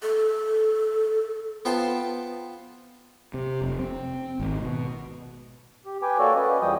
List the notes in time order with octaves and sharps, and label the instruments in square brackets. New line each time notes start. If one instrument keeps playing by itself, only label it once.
[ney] A4
[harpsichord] B3 F4 C5 G5 A5 C6
[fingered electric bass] C3
F1
C4
G#1
B2
[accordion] G4
B4 G5 G#5 D6
A#3 F#4 A4 C#5 D5
C#4 B4 D#5
E2 F3 G3 D#5 G5 D#6